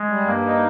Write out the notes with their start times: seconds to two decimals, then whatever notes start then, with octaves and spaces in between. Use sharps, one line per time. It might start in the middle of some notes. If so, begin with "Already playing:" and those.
Already playing: G#3
0.09 G3
0.26 G2 A#3
0.45 D#4